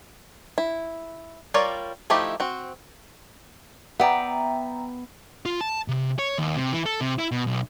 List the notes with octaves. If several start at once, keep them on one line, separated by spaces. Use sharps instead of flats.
E4
G3 F4 A#4 C#5 D5
F3 A3 D#4 E4 G4
C4 F#4
B3 D5 E5 G5 A#5
F4
A5
C3
C#5
D#2
C3
E3
A4
C3
E4
B2
B1